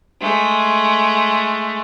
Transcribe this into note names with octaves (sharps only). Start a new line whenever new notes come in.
G#3 A3